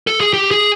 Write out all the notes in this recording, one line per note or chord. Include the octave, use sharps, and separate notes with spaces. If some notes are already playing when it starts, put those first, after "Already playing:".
A4
G#4
G4
G#4